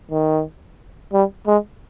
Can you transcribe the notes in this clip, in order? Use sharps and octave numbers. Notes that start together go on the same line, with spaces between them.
D#3
G3
G#3